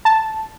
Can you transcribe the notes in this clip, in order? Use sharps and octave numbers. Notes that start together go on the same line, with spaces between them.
A5